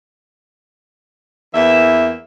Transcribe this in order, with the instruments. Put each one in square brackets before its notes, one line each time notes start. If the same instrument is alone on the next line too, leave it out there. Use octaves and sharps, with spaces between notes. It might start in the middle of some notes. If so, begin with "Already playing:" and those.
[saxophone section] E2 E3 A#3 E5